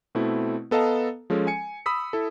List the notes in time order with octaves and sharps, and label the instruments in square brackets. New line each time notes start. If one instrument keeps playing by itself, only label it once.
[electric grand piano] B2 A3 C4 E4
B3 A4 D#5 F5 A5 A#5
F3 G#3 C#4 A4
G#5 C#7
B5 D#6 E6 B6
E4 A4